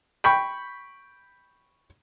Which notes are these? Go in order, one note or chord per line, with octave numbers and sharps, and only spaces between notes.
G5 B5 C#6